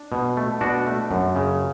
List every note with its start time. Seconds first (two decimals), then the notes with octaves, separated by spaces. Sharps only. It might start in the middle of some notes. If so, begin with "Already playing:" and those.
Already playing: D4
0.12 B2
0.37 A3
0.61 B2 D4 F#4
0.86 A3
1.11 F#2
1.36 C#3